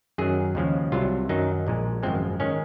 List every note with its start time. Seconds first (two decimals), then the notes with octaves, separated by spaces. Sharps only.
0.18 F#2 D#3 F#3 G#4
0.55 D#2 C#3 F3 G#3
0.92 C2 C3 F#3 F4
1.29 F#2 D#3 F#3 D#4
1.67 A#1 A#2 G#3
2.03 G#1 F#2 F3 G#3 C4
2.40 D#3 G#3 C#4